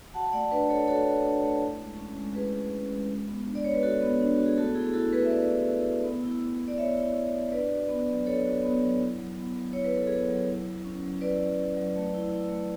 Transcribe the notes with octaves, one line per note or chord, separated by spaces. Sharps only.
F#4 F#5 A5
A3 D5 F#5
D4 B4 D5
A3 A4 C#5
F#4 A4 C#5
A3
D4
A3
E4
G#3
C#4
G#3
E4 G#4 B4
G#3
C#4
G#3
F#4
B3
D4
D5
B3 C#5
B4
F#4 A4
B3
D4
B3 F#4
G#4
A3 F#4 A4
E4 G#4
G#4
E4 F#4 A4
A3 G#4 B4
E5
A3 B4 D5
E4
E4
A3
B3
E4
E4
B3
D5
B3 C#5 E5
E4
E4
B3
D4 B4 D5
F#4
B3
F#3
D4 A4 C#5
F#4
B3
F#3
E4
F#3
B3
F#3
E4 C#5
B4
F#3 A4
B3 G#4 B4
F#3
E4
F#3
C#4
F#3
E4 B4 D5
F#3
C#4
F#3
A3
E4
E4
A3